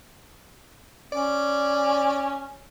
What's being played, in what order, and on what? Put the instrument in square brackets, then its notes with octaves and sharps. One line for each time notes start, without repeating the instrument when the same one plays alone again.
[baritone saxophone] C#4 [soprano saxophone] D5